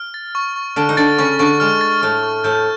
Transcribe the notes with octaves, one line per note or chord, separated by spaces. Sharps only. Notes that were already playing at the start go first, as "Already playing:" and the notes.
Already playing: F6
A6
C#6
C#6
D3 D4 F6
D#4
D3 D4 A6
C#3 C#4 C#6
D3 D4 C#6
G#3 F6
A6
A2 A3 C#6
C#6
A2 A3 G6